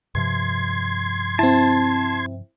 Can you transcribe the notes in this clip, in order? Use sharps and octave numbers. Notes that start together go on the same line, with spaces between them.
G2 C3 F3 C6 G#6
C4 E4 A5